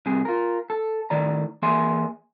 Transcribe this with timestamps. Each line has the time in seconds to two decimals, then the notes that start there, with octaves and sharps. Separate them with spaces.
0.06 C2 C3 G#4
0.25 F4 A#4
0.70 A4
1.10 A2 D#3 D5 A#5
1.62 E3 A#3 G#4 E5 G#5 C6